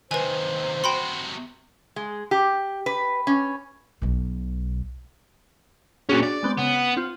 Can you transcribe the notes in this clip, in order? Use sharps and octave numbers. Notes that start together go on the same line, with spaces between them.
D#2 C3 B4 C5 G#5
C3 F#4 G5 B5 C6
G#3
G4
B4
C#4
B1 B2
A#2 C#4 D4 F#4 G#4
D5
G#3 B3 C4
C#3 B3
C4 F4